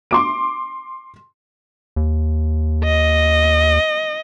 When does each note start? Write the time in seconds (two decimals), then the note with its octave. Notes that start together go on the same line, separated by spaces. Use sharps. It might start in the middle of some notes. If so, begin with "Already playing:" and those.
0.11 C6 D6 D7
1.96 D#2
2.84 D#5